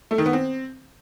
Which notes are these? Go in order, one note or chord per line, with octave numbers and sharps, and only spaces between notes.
A3
D#3
B3
C4